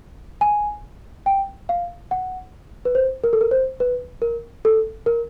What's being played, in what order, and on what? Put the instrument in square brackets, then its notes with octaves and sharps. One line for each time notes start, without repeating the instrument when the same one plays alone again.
[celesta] G#5
G5
F5
F#5
B4
C5
A#4
A4
A#4
C5
B4
A#4
A4
A#4